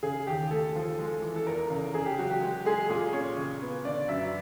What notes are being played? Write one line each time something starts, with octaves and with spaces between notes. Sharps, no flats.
C#3 G#4
D#2 G4
A3 A4
F3
G#3
E3
A4
E2 A#4
C#3
C#3 G#4
G4
F#3 F#4
G4
G#3 G4
G#3 G#4
A#2 G#4
C#4 C#5
C#3
B3
D3 D5
F#2 E5